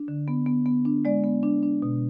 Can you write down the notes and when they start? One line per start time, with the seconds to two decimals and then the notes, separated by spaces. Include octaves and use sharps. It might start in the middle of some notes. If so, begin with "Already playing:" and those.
Already playing: D4
0.08 D3
0.28 B3
0.46 B3
0.66 B3
0.85 D4
1.05 G#3 D5
1.24 B3
1.43 D4
1.63 D4
1.82 B2